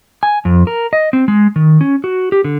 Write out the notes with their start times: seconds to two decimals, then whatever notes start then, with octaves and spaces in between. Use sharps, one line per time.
0.23 G#5
0.45 F2
0.67 A#4
0.93 D#5
1.13 C4
1.28 G#3
1.56 D#3
1.81 C#4
2.04 F#4
2.32 G4
2.44 D3